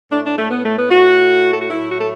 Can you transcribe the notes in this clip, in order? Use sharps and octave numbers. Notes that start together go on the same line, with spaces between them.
A2 A3 D4
D4
A3
B3
A3
B3
A2 A3 F#4
A4
F#4
A2 F#3 A3 E4
F#4
A4